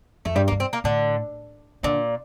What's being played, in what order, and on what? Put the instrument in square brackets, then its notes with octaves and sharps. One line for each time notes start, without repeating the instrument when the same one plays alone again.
[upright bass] F2 [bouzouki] A3
[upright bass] G2 [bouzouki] G3
[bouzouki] A#3
[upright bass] G2
[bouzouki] C4
A#3
[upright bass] A2 [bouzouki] D3
[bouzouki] A#2 [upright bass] D3